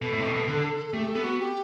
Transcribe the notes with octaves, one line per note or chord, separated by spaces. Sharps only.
B2 A4
A2
C3
B2
B2
D3
A4
A3 G4
A4
B3
F#4
G4